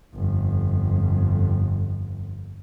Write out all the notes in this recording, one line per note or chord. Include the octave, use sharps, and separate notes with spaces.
G1 F2